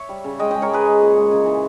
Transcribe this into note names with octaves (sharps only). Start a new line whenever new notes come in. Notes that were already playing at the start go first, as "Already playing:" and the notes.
Already playing: C#5 E5
G3
C#3
G#3 D#5 G5
G#3 D#5 G5
A#4 C#5
G#3 G#4 B4
G#3
A#2
G#3
C#3
E3